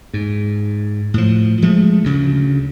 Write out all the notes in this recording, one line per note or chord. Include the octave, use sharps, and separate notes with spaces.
G#2
A2 F3
F3 G#3 A3
D2 C#3